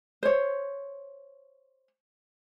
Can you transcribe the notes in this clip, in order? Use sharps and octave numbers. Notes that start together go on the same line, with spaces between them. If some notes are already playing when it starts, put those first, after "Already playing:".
C5 C#5